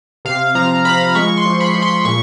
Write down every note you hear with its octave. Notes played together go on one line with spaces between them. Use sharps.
C3 F5
F3 A#5
F3 B5
G#3 C#6
C6
F3
B5
F3
C6
A#2 C#6